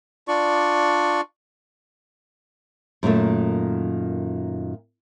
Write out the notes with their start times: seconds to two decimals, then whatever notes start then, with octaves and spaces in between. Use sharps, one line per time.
0.28 D4 F4 D5 C#6
3.03 F#2 A#2 D#3 A3